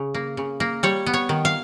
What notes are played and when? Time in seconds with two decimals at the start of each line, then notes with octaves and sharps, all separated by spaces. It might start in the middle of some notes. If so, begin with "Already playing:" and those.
Already playing: C#3
0.14 A#3
0.37 C#3
0.60 A#3
0.83 G3 C#5
1.06 B3
1.13 C#5
1.29 D#3
1.45 F5